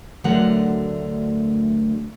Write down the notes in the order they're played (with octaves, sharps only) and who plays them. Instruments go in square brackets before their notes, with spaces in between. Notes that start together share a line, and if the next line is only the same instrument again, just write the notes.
[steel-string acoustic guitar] D2 D3 F#3 A3 A#4 F#5